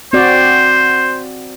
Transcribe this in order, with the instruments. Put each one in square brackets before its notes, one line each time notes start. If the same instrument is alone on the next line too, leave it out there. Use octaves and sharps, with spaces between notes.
[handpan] C4 F#4 D5 [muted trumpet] C5